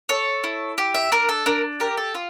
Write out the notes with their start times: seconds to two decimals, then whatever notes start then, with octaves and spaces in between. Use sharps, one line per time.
0.09 A4 C#5
0.44 E4
0.78 G4
0.94 E5
1.12 D4 A#4
1.29 A4
1.46 D4 A#4
1.80 G4 A#4
1.97 A4
2.15 F4